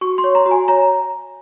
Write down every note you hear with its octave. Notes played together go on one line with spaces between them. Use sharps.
F#4 C#6
C6
C#5
A#5
F#4
G#5
C#5 A#5